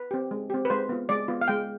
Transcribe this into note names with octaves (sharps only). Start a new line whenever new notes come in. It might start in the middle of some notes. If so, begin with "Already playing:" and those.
Already playing: B4
C4 G4
G#3
C4 G4
B4
G#3 C5
B3 F4
G#3 D5
B3 F4
F5
G#3 G5